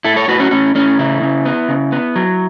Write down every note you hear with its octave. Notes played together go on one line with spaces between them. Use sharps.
A2 E4 A4
A4 C#5
A2 F#4 B4
C#4 F#4
A2 C#4
A2 C#4
C#3 E4
C#3
B3
C#3
B3
F#3